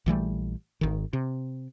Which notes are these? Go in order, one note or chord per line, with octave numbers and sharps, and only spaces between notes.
A#1 E3 G3 A3
G#1 D#3
C3